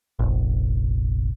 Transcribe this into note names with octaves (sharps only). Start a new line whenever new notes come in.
F1 A#1